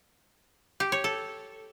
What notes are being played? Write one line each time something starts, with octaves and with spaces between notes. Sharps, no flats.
G4
C#5
A4